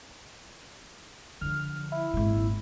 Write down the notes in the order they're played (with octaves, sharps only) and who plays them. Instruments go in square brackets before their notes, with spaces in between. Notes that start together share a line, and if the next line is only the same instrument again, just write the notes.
[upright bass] D3 F3 [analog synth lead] F6
[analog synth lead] E4
[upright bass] G#1 A#2